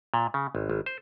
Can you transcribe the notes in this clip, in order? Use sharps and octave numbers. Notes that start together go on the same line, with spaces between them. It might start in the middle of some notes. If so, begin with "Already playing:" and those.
A#2
C#3
G#1
G#1
C5